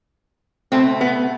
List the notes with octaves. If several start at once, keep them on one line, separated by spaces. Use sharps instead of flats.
B2 A3 C4
B3